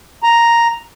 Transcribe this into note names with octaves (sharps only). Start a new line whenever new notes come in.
A#5